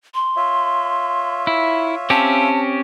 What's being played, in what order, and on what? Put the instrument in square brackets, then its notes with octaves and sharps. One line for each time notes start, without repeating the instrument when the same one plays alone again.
[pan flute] C6
[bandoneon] F4 C#5 E5
[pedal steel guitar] E4
[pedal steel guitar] C4 C#4 G4 [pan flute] A5